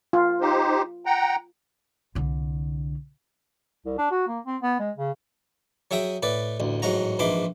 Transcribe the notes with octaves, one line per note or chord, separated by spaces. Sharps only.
F4
D#4 G4 C5
F#5 G5 A#5
C2 D3
C2
D4
F#4
A#3
C4
B3
G#3
C#3
F#3 G#4 E5 G5 D#6
A2 B4 D5
A1 D2
A1 G#2 F#3 F#4 A#5
A#1 G#2 E3 B5 C6 D6